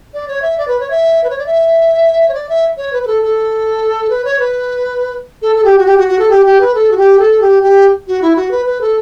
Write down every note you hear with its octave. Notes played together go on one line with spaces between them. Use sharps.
D5
C#5
E5
D5
B4
C#5
E5
B4
C#5
D5
E5
C#5
D5
E5
C#5
B4
B4
A4
A4
B4
C#5
B4
A4
A4
G4
F#4
G4
F#4
F#4
A4
G4
G4
B4
A4
F#4
G4
A4
G4
G4
F#4
E4
F#4
B4
B4
A4